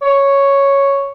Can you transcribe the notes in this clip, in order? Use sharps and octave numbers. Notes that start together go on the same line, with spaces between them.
C#5